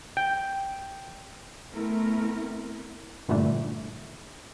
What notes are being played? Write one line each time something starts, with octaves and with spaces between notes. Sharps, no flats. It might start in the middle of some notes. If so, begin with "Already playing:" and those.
G5
A3 B3 C4 E4 A#4
G2 A#2 D3 E3 A3 D4